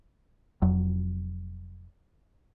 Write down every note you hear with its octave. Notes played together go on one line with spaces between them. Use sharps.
F1 F2 F#3